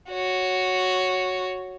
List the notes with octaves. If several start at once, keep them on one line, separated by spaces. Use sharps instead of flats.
F#4 C#5